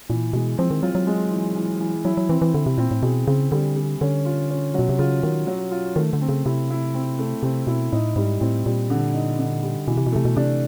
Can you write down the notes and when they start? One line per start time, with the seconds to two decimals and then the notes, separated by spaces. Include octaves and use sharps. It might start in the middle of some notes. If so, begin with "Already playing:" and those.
0.09 A#2 E3
0.33 B2 G#3
0.58 F3 C4
0.71 D#3
0.83 F#3 F4
0.95 F#3
1.07 G#3
1.31 E3
1.55 E3
1.80 E3
2.05 F#3 E4
2.17 F#3
2.29 E3 C4
2.42 E3
2.53 D3 E4
2.66 C3
2.78 A#2 C4
2.91 A2
3.03 B2 G#4
3.27 C#3 C4
3.52 D3 G3
3.76 G3
4.01 D3 C#4
4.25 F4
4.50 C#4
4.74 B2 F#3
4.89 C3
4.99 C#3 F4
5.23 D#3 F#3
5.47 F#3
5.71 F4
5.96 D#3 A3
6.13 D3
6.21 C4
6.29 C#3
6.45 C3 E4
6.70 E4
6.94 C4
7.19 A3
7.43 C3 C4
7.67 B2 E4
7.92 A2 D#4
8.16 G#2 G3
8.40 A2 C4
8.66 A#2 G3
8.90 D3
9.14 D#4
9.39 D3
9.63 G3
9.87 B2 E3
9.97 C3
10.07 B2
10.12 C3 A3
10.25 B2
10.36 C3 D4